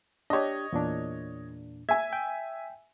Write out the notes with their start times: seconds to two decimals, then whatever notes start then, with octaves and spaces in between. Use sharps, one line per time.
0.30 D4 G4 C#5 D#5
0.73 E2 A#2 D4
1.89 E5 G#5 G#6
2.13 G5